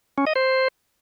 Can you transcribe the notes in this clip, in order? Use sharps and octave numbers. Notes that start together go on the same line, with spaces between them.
C#4
D#5
C5